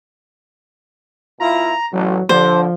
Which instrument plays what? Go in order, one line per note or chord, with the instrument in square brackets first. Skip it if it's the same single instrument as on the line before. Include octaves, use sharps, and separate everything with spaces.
[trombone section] B2 E4 F4 [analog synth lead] A#5
[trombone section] A1 [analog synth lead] F#3
[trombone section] D3 [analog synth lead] F3 [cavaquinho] C5